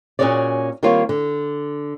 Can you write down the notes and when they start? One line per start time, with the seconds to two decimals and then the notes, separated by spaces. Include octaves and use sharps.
0.19 A#2 C#4 F#4 G#4 C#5 D5
0.83 D#3 G3 A#3 C4 F4 C#5
1.09 D3